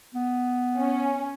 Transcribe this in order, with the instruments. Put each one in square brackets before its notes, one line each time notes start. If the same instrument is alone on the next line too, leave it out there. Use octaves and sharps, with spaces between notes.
[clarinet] B3
[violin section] C#4